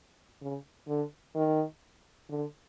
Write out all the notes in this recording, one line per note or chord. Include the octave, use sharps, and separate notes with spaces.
C#3
D3
D#3
D3